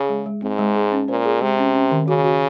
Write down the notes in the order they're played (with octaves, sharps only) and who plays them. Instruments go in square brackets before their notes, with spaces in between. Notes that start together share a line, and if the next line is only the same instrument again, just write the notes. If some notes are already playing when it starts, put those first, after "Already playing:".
Already playing: [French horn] C#3 [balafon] G#4
[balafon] G#3
G#3
[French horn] G#2 [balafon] C4
[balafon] G#3
G#4
C#4
[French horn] A#2 [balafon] C5
[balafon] G#4
[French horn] C3 [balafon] G#3
[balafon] C#4
C#4
D#3
[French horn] C#3 [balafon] F#4
[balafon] F#4